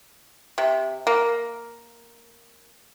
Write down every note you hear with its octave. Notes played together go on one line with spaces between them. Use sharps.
C3
A#3